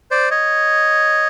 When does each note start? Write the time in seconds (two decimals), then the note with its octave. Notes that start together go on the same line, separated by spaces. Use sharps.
0.11 C5 D5
0.31 C#5 D#5